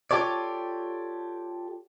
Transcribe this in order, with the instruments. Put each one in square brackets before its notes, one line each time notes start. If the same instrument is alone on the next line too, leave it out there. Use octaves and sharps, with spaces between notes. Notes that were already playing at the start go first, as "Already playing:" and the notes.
[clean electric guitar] F4 G4 A4 C#5 D5